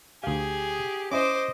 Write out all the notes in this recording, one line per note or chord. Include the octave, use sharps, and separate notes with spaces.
D2 G4 G#4 F5
C#4 E4 C5 D5 D#5 D6